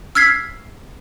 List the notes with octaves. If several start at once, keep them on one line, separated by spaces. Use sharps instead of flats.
E6 F6 G#6 B6 C7